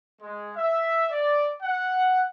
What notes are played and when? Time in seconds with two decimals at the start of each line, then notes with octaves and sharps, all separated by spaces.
0.21 G#3
0.56 E5
1.10 D5
1.62 F#5